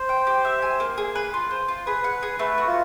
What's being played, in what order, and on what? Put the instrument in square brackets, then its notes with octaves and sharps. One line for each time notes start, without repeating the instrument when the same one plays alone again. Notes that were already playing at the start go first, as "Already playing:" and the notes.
Already playing: [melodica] C5
[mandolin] G5
G4
E5
G#5
A#3
G#4
B4
F4
C5
F4
[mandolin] G#4 [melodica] B4
[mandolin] F#5
G#4
[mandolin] A3 [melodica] B4
[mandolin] F#4
[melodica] F4